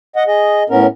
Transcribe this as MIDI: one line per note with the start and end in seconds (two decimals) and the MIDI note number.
0.16 0.23 75
0.16 0.23 78
0.27 0.63 68
0.27 0.63 75
0.70 0.86 45
0.70 0.86 59
0.70 0.86 61
0.70 0.86 70